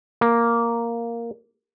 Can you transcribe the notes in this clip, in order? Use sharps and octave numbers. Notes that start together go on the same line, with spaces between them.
A#3